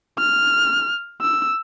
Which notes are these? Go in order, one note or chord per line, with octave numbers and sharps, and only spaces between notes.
F6
E6